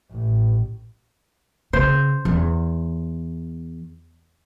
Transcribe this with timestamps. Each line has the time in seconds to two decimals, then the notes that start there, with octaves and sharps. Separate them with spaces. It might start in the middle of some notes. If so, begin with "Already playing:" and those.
0.11 A1
1.73 C#3 C5
2.25 E2